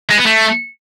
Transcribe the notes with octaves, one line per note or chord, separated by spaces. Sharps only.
G#3
B3
A3